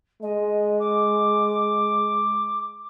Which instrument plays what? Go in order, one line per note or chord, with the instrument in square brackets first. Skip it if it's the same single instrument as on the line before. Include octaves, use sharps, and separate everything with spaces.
[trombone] G#3 [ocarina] D#5
[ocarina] D6